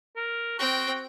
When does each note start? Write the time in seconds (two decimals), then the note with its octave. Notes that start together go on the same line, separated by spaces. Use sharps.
0.16 A#4
0.59 C4 F#4 G5